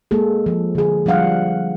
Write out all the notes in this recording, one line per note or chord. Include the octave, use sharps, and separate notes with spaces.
G#3 A#3 G#4 A4
F3
D3 G#4
F3 G3 D4 F5 F#5